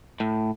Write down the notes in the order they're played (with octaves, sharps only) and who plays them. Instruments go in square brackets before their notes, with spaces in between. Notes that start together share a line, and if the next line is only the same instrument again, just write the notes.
[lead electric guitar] A2